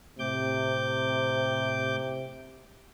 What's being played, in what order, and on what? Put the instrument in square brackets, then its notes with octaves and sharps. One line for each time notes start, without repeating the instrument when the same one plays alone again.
[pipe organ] A2 D6 G6 [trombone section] C3